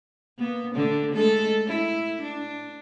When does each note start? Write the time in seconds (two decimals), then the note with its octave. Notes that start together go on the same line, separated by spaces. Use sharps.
0.38 A#3 B3
0.75 D3 A3 D4
1.13 G#3 A3 A4
1.67 E4
2.22 D4